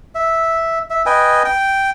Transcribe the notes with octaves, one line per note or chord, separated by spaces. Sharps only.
E5
E5
B4 D#5 G5 G#5
G5